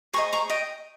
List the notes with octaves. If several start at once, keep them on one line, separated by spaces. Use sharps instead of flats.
G#4 C5 D#5 A#5 C#6
A#5 C#6
D#5 G5